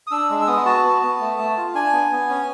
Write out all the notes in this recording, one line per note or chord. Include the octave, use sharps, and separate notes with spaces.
D#6
D4 E6
G#3
E6
B3 D#6
F#4 A5
B3
B3
A3
A3
F4
D4 G#5
B3
B3
C#4